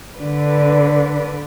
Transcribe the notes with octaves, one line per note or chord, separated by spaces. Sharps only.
D3 B4 D5